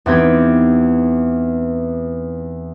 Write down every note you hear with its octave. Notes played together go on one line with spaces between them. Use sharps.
E2 B3 C4 D#4 G4 G#6